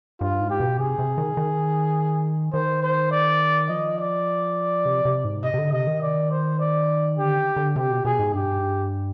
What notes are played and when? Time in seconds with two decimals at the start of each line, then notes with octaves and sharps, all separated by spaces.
0.21 G2 F4
0.40 G#2
0.50 G4
0.60 B2
0.79 C3 G#4
0.99 C3
1.18 D#3
1.37 D#3
2.53 D#3 C5
2.83 C5
3.11 D5
3.69 F3 D#5
3.99 D5
4.85 C3
5.05 C3
5.25 G#2
5.44 C3 D#5
5.54 C3
5.58 D3
5.73 C3 D#5
5.87 D#3
6.02 D5
6.31 C5
6.60 D5
7.18 D3 G4
7.56 D3
7.76 C3 G4
7.90 B2
8.05 B2 G#4
8.19 G#2
8.34 G2 G4